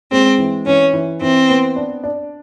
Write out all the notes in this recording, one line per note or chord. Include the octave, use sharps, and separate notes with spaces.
G#3 C4
E3
E3 C#4
E3
E3 C4
B3
D4
D4